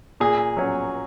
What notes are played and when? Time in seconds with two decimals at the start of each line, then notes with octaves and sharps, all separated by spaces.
0.20 A#2 G#4
0.57 F#3 C#4